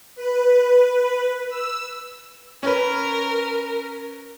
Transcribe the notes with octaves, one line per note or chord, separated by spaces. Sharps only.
B4
E6
C#4 A#4 B4